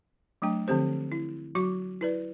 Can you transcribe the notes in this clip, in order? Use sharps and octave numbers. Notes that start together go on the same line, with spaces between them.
F#3 A3 D4 G5
D3 F3 C4 G4 C5
E4
F#3 F#4 C#6 D6
E4 B4 D5